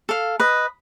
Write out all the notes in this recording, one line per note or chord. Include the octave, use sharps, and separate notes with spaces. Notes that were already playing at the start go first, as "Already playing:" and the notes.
A4 F5
B4 D#5